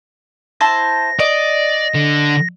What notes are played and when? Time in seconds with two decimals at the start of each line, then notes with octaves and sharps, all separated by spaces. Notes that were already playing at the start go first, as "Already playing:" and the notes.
0.61 E4 C5 A5 A#6
1.20 D5 D#5
1.95 D3